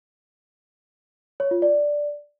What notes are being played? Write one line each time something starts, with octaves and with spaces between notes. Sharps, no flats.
C#5
F4
D5